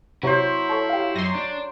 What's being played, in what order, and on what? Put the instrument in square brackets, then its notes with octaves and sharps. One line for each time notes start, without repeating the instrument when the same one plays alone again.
[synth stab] C3 [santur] F#3 C5 [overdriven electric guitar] E4
[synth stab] A4 C#5
G4 F5
[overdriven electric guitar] F#2 [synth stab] C6 C#6 A#6
[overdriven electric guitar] D4